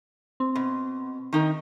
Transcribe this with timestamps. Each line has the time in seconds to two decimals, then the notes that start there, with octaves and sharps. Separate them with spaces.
0.40 C4
0.55 B2
1.33 D#3 D#4 A#4